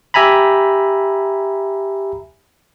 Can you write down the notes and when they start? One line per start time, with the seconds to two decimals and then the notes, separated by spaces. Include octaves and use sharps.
0.14 G4 E5 G#5 A#5 B5